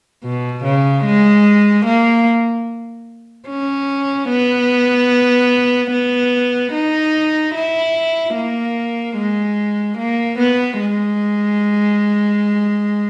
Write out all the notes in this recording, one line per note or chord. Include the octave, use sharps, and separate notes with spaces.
B2
C#3
G#3
A#3
C#4
B3
B3
D#4
E4
A#3
G#3
A#3
B3
G#3